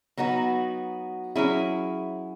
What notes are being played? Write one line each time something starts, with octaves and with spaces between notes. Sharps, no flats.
F#3 B3 D#4 F#4
F#3 C#4 E4 G#4